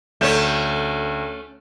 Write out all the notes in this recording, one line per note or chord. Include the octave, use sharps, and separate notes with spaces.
D2 A3 C#4 C#5 G6 E7